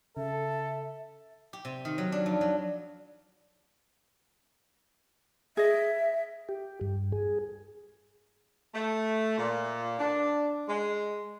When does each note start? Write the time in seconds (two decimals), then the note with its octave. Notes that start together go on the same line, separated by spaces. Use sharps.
0.17 C#3 A4 E5
1.53 G4
1.65 C3
1.85 D#3
1.98 F#3
2.12 D4
2.26 F2
2.41 F#3
5.57 G#4 D#5 E5
6.49 G4
6.81 G2
7.12 G#4
8.74 A3
9.38 A#2
9.99 D4
10.69 G#3